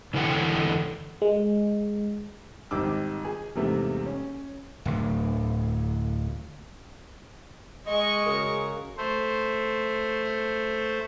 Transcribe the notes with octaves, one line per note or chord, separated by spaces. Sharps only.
E2 D3 E4 A4 F#5 G5
G#3
G#1 D#3 G3 D6 E6
G#4
E2 G#2 C3 G3 A3 A#3
C#4
D1 D2
G#3 D#5 C#6
C#3 F#4 A#4
A3 C5